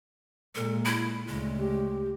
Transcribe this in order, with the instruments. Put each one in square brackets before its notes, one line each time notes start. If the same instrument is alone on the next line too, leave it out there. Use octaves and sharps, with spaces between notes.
[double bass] A#2 G#3 [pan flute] A4
[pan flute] E4
[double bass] D2 C#3 [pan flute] G#3
[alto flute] G4